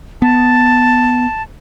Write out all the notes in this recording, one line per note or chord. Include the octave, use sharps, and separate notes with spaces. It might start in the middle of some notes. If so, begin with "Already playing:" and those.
B3 A5